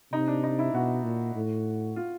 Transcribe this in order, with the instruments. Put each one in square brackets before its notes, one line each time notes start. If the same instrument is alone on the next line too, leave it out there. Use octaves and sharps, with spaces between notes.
[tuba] C3 [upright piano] D#4
[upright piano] D4
D#4
E4
[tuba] B2 [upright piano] F#4
[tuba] A#2
A2
[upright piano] F4